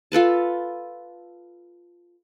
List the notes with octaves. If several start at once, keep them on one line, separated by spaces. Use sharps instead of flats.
F4 A4 B4 A5